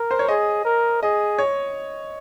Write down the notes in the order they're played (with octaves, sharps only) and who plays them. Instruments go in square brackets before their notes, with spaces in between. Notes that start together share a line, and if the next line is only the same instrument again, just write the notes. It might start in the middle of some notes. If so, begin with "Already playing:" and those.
Already playing: [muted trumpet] A#4
[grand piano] C5
C#5
[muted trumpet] G#4 [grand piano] D#5
[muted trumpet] A#4
[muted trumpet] G#4 [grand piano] D#5
[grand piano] C#5